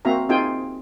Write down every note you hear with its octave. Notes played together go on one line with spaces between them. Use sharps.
A#3 C4 F#4 E5 F5 A#5
C4 D#4 F4 G#4 G5 G#5